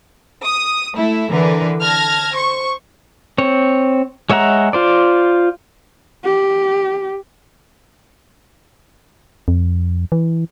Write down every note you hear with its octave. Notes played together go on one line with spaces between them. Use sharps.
D#6
A3 E4
D3 E3 A#4 B4
A5 F6 G#6 A#6
C5 C#6
C4 C#5
G#3 C#5 E5 F#5 A#5
F4 C5 D5
G4
F2
E3